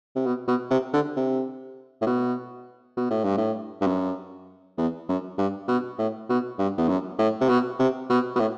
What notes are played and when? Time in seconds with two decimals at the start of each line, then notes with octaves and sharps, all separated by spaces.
0.16 C3
0.26 B2
0.47 B2
0.71 C3
0.93 D3
1.16 C3
2.01 A2
2.06 B2
2.97 B2
3.10 A2
3.24 G2
3.37 A2
3.81 G2
3.87 F#2
4.78 E2
5.08 F#2
5.38 G2
5.68 B2
5.98 A2
6.29 B2
6.59 G2
6.77 E2
6.89 F#2
7.19 A2
7.41 C3
7.49 B2
7.79 C3
8.10 B2
8.36 B2
8.40 A2